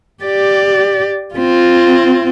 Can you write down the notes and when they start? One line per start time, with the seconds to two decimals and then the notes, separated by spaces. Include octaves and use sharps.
0.23 G4 D5
1.35 C4 F4